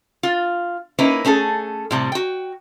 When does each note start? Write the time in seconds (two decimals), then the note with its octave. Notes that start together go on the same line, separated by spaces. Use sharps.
0.23 F4
0.99 A#3 C#4 D#4 E4 B4
1.25 A3 C#4 G#4 A4
1.91 A2 C3 G3
2.12 F#4 G5